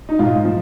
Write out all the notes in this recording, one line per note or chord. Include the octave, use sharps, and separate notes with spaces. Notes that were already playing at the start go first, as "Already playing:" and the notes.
D#4
G#2 F4
F3